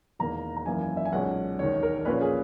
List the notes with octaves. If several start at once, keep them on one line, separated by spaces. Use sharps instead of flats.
E1 E2 D#3 A#3 A#5
A#5
G#1 F#2 E3 A#3 C#4 G#5
G#5
E5
G#5
B1 A#2 G#3 C#4 F#5
E1 D#2 D#3 C#5
A#4
A#1 A#2 A#3 C#4 B4
G#4